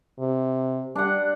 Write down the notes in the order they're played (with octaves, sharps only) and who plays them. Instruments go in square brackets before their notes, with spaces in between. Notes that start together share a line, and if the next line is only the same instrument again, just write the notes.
[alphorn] C3
[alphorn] G3 [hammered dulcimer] D4 F#5